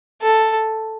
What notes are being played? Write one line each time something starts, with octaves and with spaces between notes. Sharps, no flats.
A4